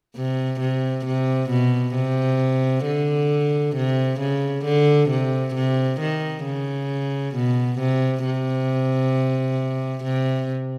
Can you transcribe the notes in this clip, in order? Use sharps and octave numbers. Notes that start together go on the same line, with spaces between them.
C3
C3
C3
B2
C3
D3
C3
C#3
D3
C3
C3
D#3
C#3
B2
C3
C3
C3